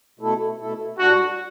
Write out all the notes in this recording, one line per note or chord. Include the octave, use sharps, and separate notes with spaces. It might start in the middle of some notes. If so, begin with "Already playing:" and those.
B2 A3 E4 A4
B2 A3 E4 A4
A2 G3 D4 F#4